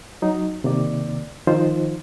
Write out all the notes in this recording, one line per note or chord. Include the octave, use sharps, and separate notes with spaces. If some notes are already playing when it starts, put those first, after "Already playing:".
F#3 D#4
C3 D#3 A#3 D5
D#3 F3 D#4 F4 C5